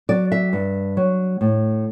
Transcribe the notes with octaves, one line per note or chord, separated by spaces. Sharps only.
F#3 D5
E5
G2
F#3
A2